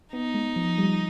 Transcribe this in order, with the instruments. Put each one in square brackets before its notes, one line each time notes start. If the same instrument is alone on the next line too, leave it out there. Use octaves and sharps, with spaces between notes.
[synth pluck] B3 [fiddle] D#4
[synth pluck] G#3
F3
G3